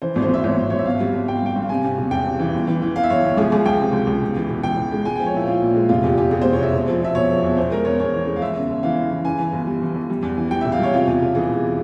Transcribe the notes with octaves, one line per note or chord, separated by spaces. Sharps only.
E3 C5
G#1
C5
G#1 E5
G#1 C#5
G#1
G#1 C#5
E5
G1 F5
G3
G1
G1 G5
F5
G2 G5
G2
C3 G#5
C3
E1
E2 G5
C3
E3
G1
E3
E3
G1 F5
E5
G1 C#5
G1
C#2 G#4
C#2 G#4
C#2 G5
C3
C#2
C#2
E1
E3
E1
E3 G5
E1
G#3
G#3 G#5
F3 G5
C#5
A#2 E4
A#2 F4
A#1
G#3
F1 F4
E2 G4
E2 G4
E2 G#4
F1 C5
C#5
E2 E5
E1
F3
F3 E5
E1 C#5
F3
E2
E2 C5
G#3 A#4
E2 C#5
E2 C#5
E3
G#3
F5
G1 E5
C#3
G1
E3 F5
C#3
E3
E3 G#5
E3
G1
G3
E3
G1
G3
E2
E3
G3 G5
E1 E5
F5
G3 C#5
C3 F4
E2
E1
E3 G#4
E1